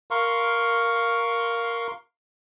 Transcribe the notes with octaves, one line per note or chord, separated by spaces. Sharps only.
A#4 F5 C6 C#6